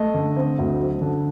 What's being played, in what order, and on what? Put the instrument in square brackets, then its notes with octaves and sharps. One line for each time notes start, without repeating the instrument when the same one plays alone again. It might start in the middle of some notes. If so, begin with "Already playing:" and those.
Already playing: [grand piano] A3 D#5
D3
C4
D2
F#3
D3